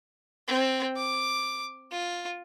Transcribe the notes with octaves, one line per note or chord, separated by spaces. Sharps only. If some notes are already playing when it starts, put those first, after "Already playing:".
C4
D6
F4